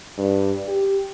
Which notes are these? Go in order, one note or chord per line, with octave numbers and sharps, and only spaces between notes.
G2
G4